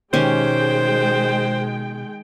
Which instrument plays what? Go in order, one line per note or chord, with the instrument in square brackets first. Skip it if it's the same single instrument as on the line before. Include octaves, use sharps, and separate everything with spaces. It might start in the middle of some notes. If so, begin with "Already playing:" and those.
[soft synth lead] B2 [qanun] D#3 C#4 G4 [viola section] G#3 G5 [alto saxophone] C5